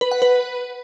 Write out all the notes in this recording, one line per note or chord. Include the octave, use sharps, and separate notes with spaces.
B4
F#5
B4